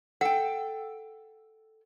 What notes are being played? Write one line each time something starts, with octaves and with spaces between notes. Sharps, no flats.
A4 F#5 G5